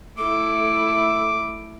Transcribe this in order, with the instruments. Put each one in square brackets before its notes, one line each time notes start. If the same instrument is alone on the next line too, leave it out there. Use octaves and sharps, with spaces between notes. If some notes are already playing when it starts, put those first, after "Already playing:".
[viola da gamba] A3 E4 [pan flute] A4 [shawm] D6